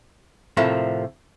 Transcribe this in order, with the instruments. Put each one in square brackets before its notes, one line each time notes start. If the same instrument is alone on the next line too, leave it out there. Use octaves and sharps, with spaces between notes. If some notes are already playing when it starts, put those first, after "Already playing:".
[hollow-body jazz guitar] A2 C3 F3 A3 A#3